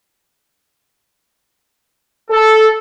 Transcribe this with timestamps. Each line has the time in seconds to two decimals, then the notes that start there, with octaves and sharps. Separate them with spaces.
2.30 A4